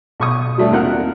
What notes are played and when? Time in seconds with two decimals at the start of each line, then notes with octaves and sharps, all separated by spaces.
0.20 B1 C#6 D#6
0.58 F#3 G3 A3 D4
0.71 D#2 C4 F4 A#4 F#5 F#6